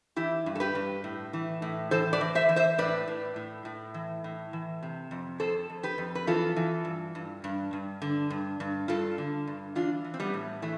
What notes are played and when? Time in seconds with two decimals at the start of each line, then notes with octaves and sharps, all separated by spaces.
0.16 E3 E4 G4
0.46 G2
0.55 A4
0.60 G4 B4
0.75 G2
1.04 A2
1.33 E3
1.62 A2
1.91 E3 A4 C5
2.13 B4 D5
2.21 E3
2.35 C5 E5
2.49 E3
2.56 C5 E5
2.78 A2 B4 D5
3.08 A2
3.36 A2
3.65 A2
3.94 E3
4.24 A2
4.53 E3
4.83 C3
5.11 F2
5.40 F2 A4 C5
5.70 F2
5.83 G4 B4
5.98 F2
6.15 B4
6.27 E3 F4 A4
6.56 E3
6.85 G2
7.15 G2
7.44 G2
7.73 G2
8.02 D3
8.30 G2
8.60 G2
8.88 G2 F4 A4
9.18 D3
9.47 G2
9.75 E3 D4 F4
10.04 E3
10.14 C4
10.20 G3 B3
10.34 A2
10.62 E3 A3